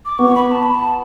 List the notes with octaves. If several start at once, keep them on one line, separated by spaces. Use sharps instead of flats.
D6
B3 C#6
B5
A5
B5
A5